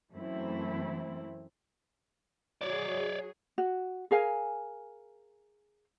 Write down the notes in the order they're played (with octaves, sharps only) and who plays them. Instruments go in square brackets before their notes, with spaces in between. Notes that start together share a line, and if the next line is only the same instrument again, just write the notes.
[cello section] F#2 E3 A3 C4 E4
[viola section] F#3 G#4 [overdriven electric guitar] C#5 D5
[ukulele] F#4
G#4 A#4 F5 G#5